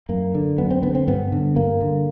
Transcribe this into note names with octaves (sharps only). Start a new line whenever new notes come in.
F#2 A#3
D3
F#2 B3
C4
D3 B3
C4
G2 B3
D3
G2 A#3
D3